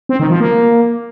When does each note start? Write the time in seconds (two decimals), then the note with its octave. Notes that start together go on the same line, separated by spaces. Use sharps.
0.09 C4
0.20 D#3
0.30 F3
0.40 A#3